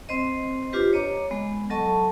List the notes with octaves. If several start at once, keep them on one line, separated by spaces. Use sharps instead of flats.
C4 C5 D#5
D4 F4 G4 B4 C5
C#5 D#5 A#5 D6
G#3 B3
F#3 A4 D#5 A5 C#6